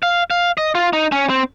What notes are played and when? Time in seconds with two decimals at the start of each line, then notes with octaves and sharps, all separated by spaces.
0.03 F5
0.30 F5
0.58 D#5
0.75 F4
0.93 D#4
1.12 C#4
1.29 C4